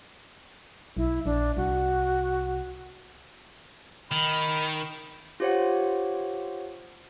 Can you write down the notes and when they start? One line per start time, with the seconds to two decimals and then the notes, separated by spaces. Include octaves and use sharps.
0.97 B1 E4
1.26 A#1 D4
1.57 C2 F#4
4.11 D#3 B5
5.40 F4 G4 C5 C#5 F#5